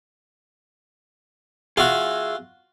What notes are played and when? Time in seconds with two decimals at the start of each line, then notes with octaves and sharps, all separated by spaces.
1.77 F4 F#4 G#4 E5